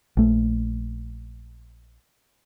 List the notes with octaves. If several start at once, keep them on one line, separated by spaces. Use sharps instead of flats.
A#1 A3